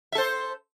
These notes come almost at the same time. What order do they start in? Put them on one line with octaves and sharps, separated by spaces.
E5 A4 C5